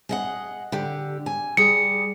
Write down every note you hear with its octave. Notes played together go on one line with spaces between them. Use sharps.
G#4 D#5 F#5
D3 G4
G#5
G3 G#4 C#7